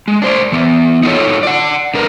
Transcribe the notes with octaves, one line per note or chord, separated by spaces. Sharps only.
G#3
D4 C5 D5
E3 B3
D#4 F4 F#4 A4 C#5
D5 F#5
D3 D4 A#4 B4